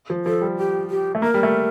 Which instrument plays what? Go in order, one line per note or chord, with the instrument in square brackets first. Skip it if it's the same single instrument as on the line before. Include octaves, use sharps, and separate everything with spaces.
[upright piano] F3
[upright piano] F3 [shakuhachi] A4
[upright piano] G3
[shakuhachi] G4
G4
[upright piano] A3
[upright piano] A#3 [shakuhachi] A#4
[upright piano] G3
A3